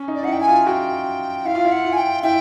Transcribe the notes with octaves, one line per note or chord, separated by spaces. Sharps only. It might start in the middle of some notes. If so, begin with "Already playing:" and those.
Already playing: C#4
D#4
D5
D#4 F#5
E4
G5
G#5
F4
F#4 G5
E4 F5
F4
E4
F#5
F4
G#5
G5
E4 G5